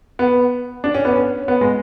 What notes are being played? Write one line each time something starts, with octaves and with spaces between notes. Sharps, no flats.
B3
D4
C#4
B3
C#4
B3
G#3